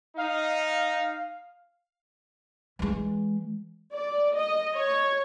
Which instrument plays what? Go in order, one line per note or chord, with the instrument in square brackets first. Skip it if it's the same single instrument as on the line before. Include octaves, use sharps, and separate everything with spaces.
[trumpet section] D#4 [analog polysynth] F5
[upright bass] E3 G#3
[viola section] D5
D#5
C#5